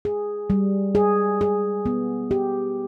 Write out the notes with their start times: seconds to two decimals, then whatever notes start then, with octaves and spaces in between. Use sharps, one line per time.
0.05 G#4
0.50 G3
0.95 G#4
1.41 G#4
1.86 B3
2.31 G4